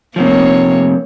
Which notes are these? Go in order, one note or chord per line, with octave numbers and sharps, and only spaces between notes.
C3 F3 A#3 C#5